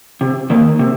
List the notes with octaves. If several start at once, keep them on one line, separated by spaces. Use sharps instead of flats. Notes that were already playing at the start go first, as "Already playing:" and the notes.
C3
D#3 A#3 D#4
C3